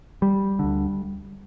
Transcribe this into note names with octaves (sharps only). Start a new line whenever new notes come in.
G3
D2 D3